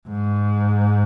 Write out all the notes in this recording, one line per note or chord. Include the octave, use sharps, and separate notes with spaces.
G#2